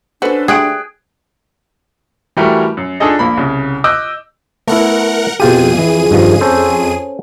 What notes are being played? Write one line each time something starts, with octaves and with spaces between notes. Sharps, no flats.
C#4 D4 F#4 A4 B4 C5
D3 A3 F#4 G#4 G5 F#6 D7
E3 G3 A3 F#4 G4 A#4
F#2
D4 D#4 F4 G#4 A4 D#5
A#1 A#3 B5
C2 C#3
D#5 D6 E6 F#6 G6
A3 B3 E4 A#4 F#5
F2 B2 F4 G4 G#4 D#7
E3
G2 D#3 F3
C#4 A4 C5